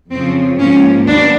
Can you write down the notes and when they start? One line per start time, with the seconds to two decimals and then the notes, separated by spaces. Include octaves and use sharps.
0.11 F2 C#3 F3 C4
0.58 G#2 F3 A#3 C#4
1.06 D#2 D#3 F#3 B3 D4